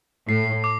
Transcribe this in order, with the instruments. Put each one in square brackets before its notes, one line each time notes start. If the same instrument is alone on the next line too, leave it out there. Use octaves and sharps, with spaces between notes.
[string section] A2 [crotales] C7
[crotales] D6